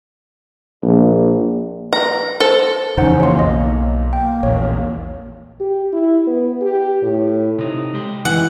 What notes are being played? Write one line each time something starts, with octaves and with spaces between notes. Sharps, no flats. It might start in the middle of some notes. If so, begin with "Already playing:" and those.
A#1
B4 A#5
A4 C5
F2 C#3 E3 C#4 D#4 C5 F#5
A#3 C#5 C6
B1 D#5
A#3 G5
A#1 E2 C#5
G4
E4
B3
G4
A2
C3 D#4
G#3 G4
E3 F#5